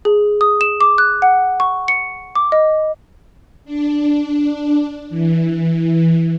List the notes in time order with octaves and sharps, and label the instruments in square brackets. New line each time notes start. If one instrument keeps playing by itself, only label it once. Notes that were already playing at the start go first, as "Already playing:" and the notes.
[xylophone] G#4
D#6
E7
D6
F#6
F#5
C#6
C#7
D6
D#5
[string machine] D4
E3